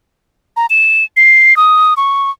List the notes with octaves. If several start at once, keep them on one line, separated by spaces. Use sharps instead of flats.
A#5
E7
C7
D#6
C#6